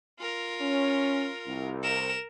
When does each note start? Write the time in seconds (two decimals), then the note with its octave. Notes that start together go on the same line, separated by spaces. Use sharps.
0.19 F4 A#4
0.60 C#4
1.46 C2
1.83 A#4 E7